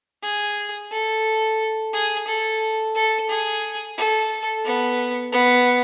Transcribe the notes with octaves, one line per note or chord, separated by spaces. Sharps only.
G#4
A4
G#4
A4
A4
G#4
A4
B3
B3